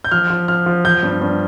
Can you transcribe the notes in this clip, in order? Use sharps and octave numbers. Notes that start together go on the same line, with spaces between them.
G6
F3 F6
F3
F3 F6
F3
F3 G6
G2
G2